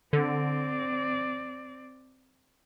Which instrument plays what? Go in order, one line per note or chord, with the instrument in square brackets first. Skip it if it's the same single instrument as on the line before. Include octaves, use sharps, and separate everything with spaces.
[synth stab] D3 [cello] C4 D5